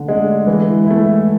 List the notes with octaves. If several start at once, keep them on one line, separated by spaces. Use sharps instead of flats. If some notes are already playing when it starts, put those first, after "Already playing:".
Already playing: D3 A3
G#3 D4
E3 G#3
A3 E4